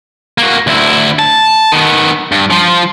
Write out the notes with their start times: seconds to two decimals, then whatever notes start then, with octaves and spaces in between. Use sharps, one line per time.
0.38 A#3 F#4
0.67 D2 E4
1.19 A5
1.72 D#3 B3
2.32 G2
2.50 F3 F4